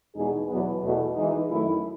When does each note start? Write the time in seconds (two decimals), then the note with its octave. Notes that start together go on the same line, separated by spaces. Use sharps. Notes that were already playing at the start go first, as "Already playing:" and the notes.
0.15 E2 B2 G#3 D#4 G#4
0.49 E2 B2 F#3 B3
0.82 E2 B2 A3
1.16 E3 G#3 D#4
1.50 F#2 D#3 A3 E4